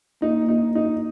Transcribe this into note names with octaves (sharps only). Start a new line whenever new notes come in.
A#3 D#4
A#3
D#4
A#3
D#4
F#4